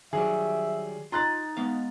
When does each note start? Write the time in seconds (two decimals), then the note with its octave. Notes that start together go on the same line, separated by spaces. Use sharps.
0.13 D#3 F#3 G3 G#4 E5
1.12 D#4 F4 A#5 C6 F#6 A6
1.57 G#3 B3 F5